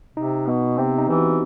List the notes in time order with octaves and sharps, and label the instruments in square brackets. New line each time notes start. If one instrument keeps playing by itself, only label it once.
[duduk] C3 [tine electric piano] D#4
[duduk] B2 [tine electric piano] B3
[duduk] C3 [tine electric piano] C4
[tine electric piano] D#4
[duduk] E3 [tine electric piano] G4
[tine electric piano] F#4